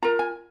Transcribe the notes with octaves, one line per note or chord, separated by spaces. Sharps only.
F4 A#4 A#5
G#5